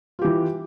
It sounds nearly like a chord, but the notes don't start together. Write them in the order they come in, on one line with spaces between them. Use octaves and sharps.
F4 G4 E3